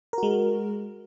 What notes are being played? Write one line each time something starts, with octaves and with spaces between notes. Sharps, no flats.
G#3 F#4 A#4